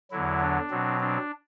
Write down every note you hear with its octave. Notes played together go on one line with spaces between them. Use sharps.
E2 D3 F#3 E4
D4
B2 F#3 C4
D4